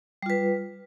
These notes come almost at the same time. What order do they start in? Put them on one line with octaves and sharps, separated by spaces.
G3 F4 B4